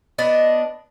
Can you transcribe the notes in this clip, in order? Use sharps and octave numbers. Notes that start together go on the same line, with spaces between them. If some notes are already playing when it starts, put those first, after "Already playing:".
B3 D4 D#5